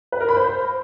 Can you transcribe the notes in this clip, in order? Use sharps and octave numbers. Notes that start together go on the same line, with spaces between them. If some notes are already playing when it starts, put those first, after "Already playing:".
B4
A#4
B5
C5